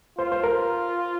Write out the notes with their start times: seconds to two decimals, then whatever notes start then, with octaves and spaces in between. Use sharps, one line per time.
0.19 F4 C5
0.32 C5
0.44 A#4